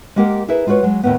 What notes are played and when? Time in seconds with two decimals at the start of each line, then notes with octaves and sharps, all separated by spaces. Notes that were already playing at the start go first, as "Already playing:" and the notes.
0.16 G#3 A#3 G4 A#4 F#5
0.48 E4 G#4 A#4 B4 E5
0.67 G#3 F4 F#4 B4 C#5
0.83 F#3 G#3
1.03 D#2 A2 B3